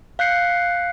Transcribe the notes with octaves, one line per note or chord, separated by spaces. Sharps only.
F5 F#6 G6 C7 C#7